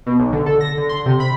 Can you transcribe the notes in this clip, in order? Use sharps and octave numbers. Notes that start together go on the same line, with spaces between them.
B2
B1
D3
A4
A#6
D3
C6
C3
B5